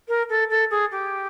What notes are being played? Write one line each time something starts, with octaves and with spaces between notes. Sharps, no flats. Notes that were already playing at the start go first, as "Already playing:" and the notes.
A#4
A4
A4
G#4
G4